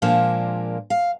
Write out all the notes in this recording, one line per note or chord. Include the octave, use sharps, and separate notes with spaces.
A#2 F3 G#3 A#3 D4
F5